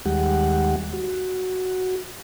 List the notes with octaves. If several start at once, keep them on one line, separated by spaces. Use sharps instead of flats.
D#2 D#3 G3 G#3 G4 F#5
F#4